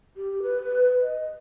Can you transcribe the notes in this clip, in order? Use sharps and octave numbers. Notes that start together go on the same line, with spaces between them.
G4
B4
D#5